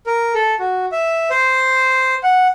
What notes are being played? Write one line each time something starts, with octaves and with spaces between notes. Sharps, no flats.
A#4
A4
F#4
E5
C5
F#5